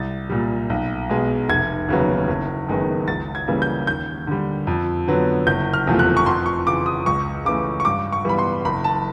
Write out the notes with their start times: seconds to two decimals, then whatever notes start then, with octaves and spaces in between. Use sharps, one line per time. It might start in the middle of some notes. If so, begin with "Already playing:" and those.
Already playing: C2 A6
0.30 A#2 G3
0.70 B1
1.10 B2 G#3
1.49 F1 G#6
1.88 D#2 C#3 F#3 B3
2.28 F#1
2.68 F#2 D#3 G#3 B3
3.08 C#2 A6
3.35 G#6
3.48 C#3 E3 G3 A#3
3.62 G6
3.87 D#2 G6
4.27 D3 G3
4.67 F2
5.08 D3 F#3 B3
5.47 F#1 G6
5.74 F6
5.87 E2 C3 F3 A3
5.99 F#6
6.17 C#6
6.26 F2 C6
6.46 C#6
6.66 C#3 E3 D6
6.86 D#6
7.06 C#2 C#6
7.45 C#3 E3 A3 D6
7.80 C#6
7.85 G2 D6
8.12 C#6
8.25 E3 G3 B3 B5
8.38 C6
8.65 F#1 B5
8.84 A5